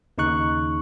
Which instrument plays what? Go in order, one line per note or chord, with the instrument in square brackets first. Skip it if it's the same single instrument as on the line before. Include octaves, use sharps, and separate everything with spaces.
[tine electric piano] D#2 C#3 D#4 C#6 F#6